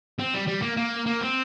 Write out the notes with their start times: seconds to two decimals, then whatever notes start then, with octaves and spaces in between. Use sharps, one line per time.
0.19 C4
0.34 G3
0.48 G3
0.62 A#3
0.77 A#3
1.06 A#3
1.20 C4